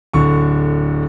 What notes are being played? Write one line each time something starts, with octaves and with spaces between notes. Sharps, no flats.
D1 D3 C#6